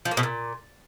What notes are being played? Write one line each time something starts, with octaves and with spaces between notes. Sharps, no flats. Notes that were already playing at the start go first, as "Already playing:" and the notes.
F3
A#3
B2
A#2